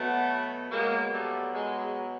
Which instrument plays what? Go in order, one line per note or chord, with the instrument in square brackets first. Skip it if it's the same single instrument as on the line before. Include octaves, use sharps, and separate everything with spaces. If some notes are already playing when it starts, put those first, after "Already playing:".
Already playing: [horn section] B2 F#3 A3 B3
B2 F#3 G#3 A#3
G3 A3
G#3